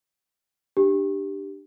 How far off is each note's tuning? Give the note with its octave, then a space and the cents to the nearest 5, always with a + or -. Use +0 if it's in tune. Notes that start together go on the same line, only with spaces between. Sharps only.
D4 +20 G4 +0